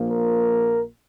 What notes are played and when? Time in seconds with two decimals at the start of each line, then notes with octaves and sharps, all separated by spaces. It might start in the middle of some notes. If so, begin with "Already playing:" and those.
Already playing: A#1 A#2 F3 A#3
0.10 A#4